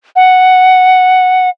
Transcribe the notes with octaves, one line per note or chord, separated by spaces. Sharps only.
F#5